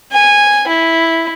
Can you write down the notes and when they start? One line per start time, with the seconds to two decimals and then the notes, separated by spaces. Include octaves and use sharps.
0.12 G#5
0.68 E4